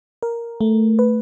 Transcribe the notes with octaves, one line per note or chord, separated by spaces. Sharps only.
A#4
A3
B4